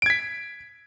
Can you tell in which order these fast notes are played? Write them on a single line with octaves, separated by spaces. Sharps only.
D7 G#6 B6